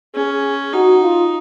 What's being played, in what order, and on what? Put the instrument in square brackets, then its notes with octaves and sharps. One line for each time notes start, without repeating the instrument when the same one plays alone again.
[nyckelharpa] C#4 [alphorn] G#4
[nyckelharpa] D#4 [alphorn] F#4
[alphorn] F4